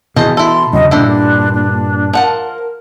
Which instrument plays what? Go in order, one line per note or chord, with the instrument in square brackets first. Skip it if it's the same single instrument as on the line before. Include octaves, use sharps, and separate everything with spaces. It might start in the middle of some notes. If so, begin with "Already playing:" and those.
[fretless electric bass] B2 E3 [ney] G#4 [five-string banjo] C5 D#5 A5
[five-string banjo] E4 A4 [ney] C6
[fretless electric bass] E1 C#3 F#3 [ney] D#5
[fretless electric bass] G2 A#2 [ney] D4 [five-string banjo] E4 A4 C5
[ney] D4
[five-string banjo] F3 F#5 A5 [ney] A#4